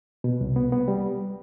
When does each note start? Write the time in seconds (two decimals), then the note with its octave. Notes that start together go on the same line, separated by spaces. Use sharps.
0.24 B2
0.41 C2
0.56 B3
0.72 B3
0.88 G3